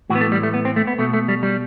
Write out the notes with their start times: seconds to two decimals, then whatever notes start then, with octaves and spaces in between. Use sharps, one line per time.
0.10 A2 E3 F#4
0.15 B3
0.21 A3
0.32 G3
0.43 A3
0.54 B3
0.65 C4
0.76 A3
0.87 B3
0.98 B2 A3
1.13 A3
1.28 G3
1.43 G3